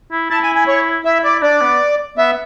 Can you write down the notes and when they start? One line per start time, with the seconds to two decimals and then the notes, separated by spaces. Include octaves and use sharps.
0.12 E4
0.30 E4 A5
0.43 G#5
0.55 G#5
0.68 C#5
1.05 E4 E5
1.24 D5
1.42 D4 D5
1.61 B3
2.17 B3 E5